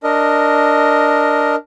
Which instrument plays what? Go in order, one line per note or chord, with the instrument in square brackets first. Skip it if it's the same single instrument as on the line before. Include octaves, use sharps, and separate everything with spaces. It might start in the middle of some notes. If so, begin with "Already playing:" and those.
[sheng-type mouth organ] D4 A#4 D#5